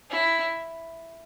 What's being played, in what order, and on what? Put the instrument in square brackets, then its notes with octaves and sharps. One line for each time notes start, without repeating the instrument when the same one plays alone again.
[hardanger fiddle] E4